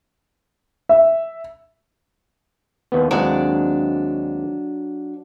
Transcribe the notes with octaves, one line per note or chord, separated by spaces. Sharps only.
E5
D#2 B3
D#2 F#3 G#3 C4 D4 D5